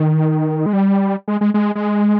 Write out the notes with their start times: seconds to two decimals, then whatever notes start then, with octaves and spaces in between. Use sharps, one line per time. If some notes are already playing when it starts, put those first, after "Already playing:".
Already playing: D#3
0.66 G#3
0.73 G3
1.28 G#3
1.41 G#3
1.54 G#3
1.75 G#3